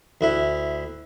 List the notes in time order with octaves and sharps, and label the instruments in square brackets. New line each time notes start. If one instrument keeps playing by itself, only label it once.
[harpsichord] D2 E4